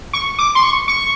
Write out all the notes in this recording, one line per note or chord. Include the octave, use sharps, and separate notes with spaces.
C#6
D6
C6
C#6
C#6